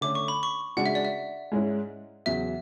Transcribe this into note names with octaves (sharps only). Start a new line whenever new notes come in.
D3 A3 C#4 D6
C#6
B5
C#6
C#3 G#3 D4 F#4 F#5
E5
D5
E5
G#2 G#3 C#4 E4
E2 C#3 F#3 E5